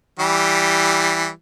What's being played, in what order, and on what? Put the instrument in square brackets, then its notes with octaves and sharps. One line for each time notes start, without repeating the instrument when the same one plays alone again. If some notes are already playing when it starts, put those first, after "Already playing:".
[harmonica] E3 G3